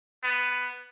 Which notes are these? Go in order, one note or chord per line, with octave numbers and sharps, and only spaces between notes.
B3